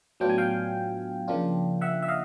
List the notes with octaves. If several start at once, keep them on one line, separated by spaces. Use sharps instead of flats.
A2 F#3 B3 D4 F4 G5
G#5
F5 G5
C#3 F3 A#3 D4 F4
E5 F#5
E5
D#5 F5